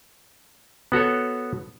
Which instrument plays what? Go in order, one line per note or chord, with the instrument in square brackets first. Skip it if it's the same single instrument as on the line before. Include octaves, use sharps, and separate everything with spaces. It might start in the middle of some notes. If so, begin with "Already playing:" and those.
[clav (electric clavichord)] B3 F#4 A4 C#5